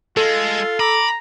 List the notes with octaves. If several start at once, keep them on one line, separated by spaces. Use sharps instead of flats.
G#3 F4 A4
A#5 B5 D6